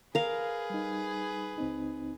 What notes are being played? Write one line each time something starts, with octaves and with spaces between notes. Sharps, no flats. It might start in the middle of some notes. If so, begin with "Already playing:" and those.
G#4 A#4 B4 F5
G3 D#4
C#2 C4 D#4